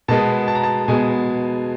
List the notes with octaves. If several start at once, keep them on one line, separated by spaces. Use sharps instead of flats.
B2 G#3 B3 A5
A5
A#5
A5
B2 G#3 B3 G#5